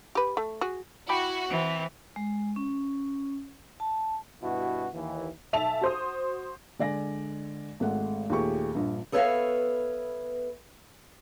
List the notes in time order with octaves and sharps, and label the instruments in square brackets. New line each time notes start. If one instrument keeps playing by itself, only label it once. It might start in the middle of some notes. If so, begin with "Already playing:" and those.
[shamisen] G4 B4
A3
F#4 G#4
[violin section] E4 F#4 [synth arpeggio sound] G5 B5 D6
[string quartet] E3 [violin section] C4
[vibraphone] G#3
C#4
A5
[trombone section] G2 B2 E4 F#4
D#2 E3
[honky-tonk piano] B1 E5 A5 F7
F#4 C5 D#6
[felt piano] D3 G#3 D5 G#5 A#6
G#1 G#3 A3 F#5
D#2 A#2 A3 G4 G#4 C#6
A#1 G2
[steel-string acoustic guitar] B3 A4 B4 C#5 E5 F5